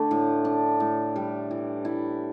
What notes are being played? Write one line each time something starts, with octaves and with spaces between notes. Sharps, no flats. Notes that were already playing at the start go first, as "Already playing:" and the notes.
Already playing: D3 A3 D4
A2
D4
A2
G3
E3
E4